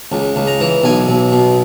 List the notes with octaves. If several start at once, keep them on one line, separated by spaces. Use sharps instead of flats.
C#2
C#2
A#5
E3
B1 G#5
B1
B2